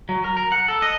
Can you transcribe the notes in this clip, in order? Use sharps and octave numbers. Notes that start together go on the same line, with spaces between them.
F#3
A#4
A#4
F#5
A4
D#5